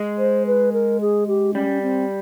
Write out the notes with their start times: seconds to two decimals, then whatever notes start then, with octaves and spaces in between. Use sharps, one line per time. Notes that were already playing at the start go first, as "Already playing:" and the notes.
Already playing: G#3
0.18 C5
0.47 B4
0.73 A#4
1.01 G#4
1.27 G4
1.54 G3 C#4
1.82 C4